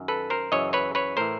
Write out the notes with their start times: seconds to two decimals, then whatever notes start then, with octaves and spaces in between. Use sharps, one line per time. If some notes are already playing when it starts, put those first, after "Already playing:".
Already playing: F#2 D#3
0.08 A4 B4
0.30 A#4 C5
0.52 F#2 C#3 E3 C#5 D#5
0.73 B4 C#5
0.95 B4 C#5
1.17 A2 E3 A#4 C5